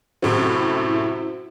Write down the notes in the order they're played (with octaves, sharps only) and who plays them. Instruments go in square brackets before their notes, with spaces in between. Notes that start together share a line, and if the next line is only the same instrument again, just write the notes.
[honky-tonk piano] F#2 A2 C3 [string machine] E4 [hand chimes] F#4 C5